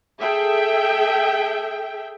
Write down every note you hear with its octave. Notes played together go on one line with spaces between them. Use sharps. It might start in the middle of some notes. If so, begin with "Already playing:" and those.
G#4 A4 E5 G5